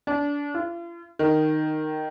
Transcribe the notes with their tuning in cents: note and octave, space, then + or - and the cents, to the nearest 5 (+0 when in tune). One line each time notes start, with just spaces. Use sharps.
D4 -25
F4 -40
D#3 -10